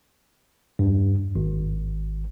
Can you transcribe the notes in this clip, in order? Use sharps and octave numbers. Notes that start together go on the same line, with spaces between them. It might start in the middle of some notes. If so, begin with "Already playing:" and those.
E2 G2
G#1